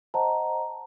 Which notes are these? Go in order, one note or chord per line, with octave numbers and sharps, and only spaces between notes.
C5 D#5 F#5 A5 A#5